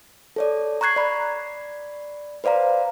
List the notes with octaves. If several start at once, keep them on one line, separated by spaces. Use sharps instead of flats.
A4 C#5 D5
A#5 C#6 F#6 G#6 C7
D5 B5
B4 C5 D5 F5 A#5